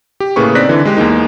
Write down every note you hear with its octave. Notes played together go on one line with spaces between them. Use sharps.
G4
A2 C#3 A#3 G#4 B4 C#6
C4 D#4 D5 F#6 A#6 B6
D3 E3
G#3 G4
E2 G#3 A#3 D#4